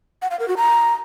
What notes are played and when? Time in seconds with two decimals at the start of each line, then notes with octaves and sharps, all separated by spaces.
0.22 F#5
0.31 F5
0.39 A#4
0.48 F#4
0.57 A#5